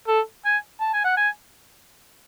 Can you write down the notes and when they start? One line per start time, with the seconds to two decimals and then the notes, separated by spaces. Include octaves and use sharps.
0.08 A4
0.45 G#5
0.81 A5
0.93 G#5
1.04 F#5
1.17 G#5